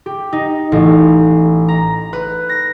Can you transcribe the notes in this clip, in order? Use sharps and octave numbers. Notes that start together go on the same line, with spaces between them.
G4
D#4
A1
A#5
B4
A#6